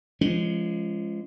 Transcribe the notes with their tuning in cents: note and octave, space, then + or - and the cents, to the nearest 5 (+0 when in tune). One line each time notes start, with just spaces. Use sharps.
F3 -30 G#3 +0 C#4 +0